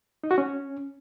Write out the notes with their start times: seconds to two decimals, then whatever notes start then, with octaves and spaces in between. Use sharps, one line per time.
0.24 D#4
0.31 F#4
0.38 C#4